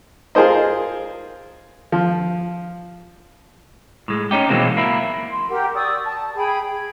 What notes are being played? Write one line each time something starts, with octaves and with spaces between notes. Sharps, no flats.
F4 G#4 A#4 C5 D#5
F3
A2 G#3
C#4 D#4 G4
B2 E3 F#3 G#3 A#3 C4
A#3 E4
C6
G4 A#4 F#5
D5 C#6 D#6 E6
A5
G#4 G5 B5
G#4